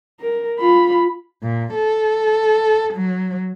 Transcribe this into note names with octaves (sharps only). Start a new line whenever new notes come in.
A#4
F4 B5
A#2
A4
F#3